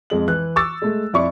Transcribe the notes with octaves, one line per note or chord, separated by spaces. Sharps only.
F2 G#3 F#7
E3 F#6
C#6 D6 E6 A6
G#3 A3
F2 E4 D5 C#6